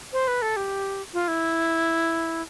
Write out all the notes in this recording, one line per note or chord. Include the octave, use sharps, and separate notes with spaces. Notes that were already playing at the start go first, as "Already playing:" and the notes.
C5
B4
A4
G4
F4
E4